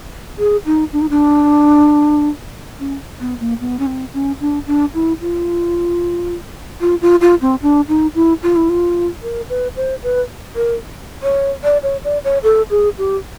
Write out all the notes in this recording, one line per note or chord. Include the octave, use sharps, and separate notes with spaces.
G#4
D#4
D4
D#4
D4
C#4
B3
A#3
B3
C#4
C4
C#4
D4
D4
E4
F4
F4
F4
F4
C4
D4
D#4
E4
F4
E4
F4
A#4
B4
C5
B4
A#4
C#5
D5
C#5
D5
C#5
A4
G#4
G4